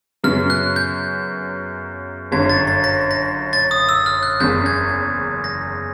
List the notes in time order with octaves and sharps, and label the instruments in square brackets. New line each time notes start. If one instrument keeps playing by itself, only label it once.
[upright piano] F#2 C#3 F#3 B3 [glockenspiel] F6
[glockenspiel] F#6
G6
[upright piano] G1 F#2 D3 [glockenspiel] G#6
[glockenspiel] A6
A6
A#6
A#6
A6
D#6
E6
F6
F#6
[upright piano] F#1 E2 C#3 [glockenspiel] G6
[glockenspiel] G#6
A#6